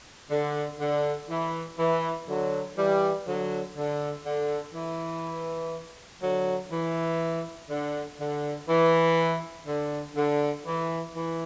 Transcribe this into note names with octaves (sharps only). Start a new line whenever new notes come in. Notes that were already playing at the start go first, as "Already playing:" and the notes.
D3
D3
E3
E3
D3 F#3
E3 G3
D3 F#3
D3
D3
E3
D3 F#3
E3
D3
D3
E3
D3
D3
E3
E3